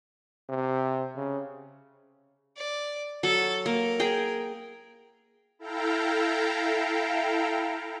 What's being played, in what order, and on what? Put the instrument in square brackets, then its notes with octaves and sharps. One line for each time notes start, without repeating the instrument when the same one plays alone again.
[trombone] C3
C#3
[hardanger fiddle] D5
[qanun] F#3 [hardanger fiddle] A4
[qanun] A#3 [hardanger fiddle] A#4
[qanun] G#4 G5
[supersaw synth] E4 A4 F5 G5 A#5